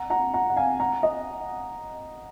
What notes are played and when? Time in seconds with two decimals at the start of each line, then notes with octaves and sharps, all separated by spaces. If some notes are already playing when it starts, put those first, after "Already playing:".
Already playing: F#5 A#5
0.10 F#5 A#5
0.34 F#5 A#5
0.50 F#5
0.56 F5 G#5
0.80 F#5 A#5
1.03 D#5